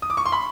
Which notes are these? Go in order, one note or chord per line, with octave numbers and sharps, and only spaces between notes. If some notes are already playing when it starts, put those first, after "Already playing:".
D#6
D6
C#6
C6
B5